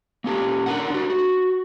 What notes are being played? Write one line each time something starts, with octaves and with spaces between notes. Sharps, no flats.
A#3 C#4 G4
D4 A#4 F#5
D4 F#4
F#4